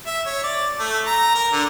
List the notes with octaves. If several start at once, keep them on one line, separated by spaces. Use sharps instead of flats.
E5
C#5
D5
A3
A#5
A#4
D3